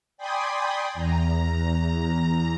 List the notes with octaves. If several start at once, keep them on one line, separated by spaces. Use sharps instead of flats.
D5 G5 G#5 B5 C6 D#6
E2 A#5